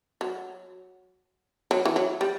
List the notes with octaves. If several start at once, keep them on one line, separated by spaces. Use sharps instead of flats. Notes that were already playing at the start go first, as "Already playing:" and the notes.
F#3
F#3
E3
F#3
G3